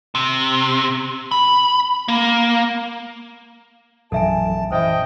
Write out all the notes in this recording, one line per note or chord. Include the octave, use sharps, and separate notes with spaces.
C3
B5
A#3
A#1 F#2 E3 A4 E5 G#5 A5
E3 C5 D#5 E5 G5